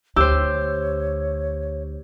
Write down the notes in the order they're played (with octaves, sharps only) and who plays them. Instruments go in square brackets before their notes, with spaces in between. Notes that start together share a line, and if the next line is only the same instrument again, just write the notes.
[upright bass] D2 D3 [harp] G4 C5 [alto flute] C#5 [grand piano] E6